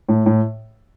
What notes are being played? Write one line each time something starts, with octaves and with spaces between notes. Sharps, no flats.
A2
A2